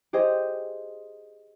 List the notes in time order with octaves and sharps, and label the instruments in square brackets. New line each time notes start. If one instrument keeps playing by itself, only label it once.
[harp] G4 G#4 C5 D#5